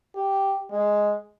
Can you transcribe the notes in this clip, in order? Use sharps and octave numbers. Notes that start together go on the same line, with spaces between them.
G4
G#3